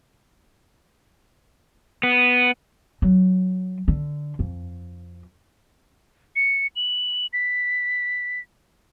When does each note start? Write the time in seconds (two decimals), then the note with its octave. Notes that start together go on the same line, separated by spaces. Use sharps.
2.03 B3
3.02 F#3
3.88 D3
4.39 F2
6.36 C#7
6.76 F#7
7.33 B6